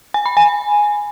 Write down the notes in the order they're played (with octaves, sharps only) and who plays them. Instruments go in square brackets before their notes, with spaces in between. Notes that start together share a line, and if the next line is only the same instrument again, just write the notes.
[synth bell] G#5
B5
G#5